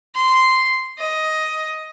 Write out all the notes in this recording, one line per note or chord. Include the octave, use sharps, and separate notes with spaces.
C6
D#5